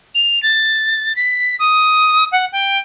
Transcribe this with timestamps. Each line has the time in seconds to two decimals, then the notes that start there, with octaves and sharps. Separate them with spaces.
0.15 F7
0.43 A6
1.16 B6
1.59 D#6
2.32 F#5
2.53 G5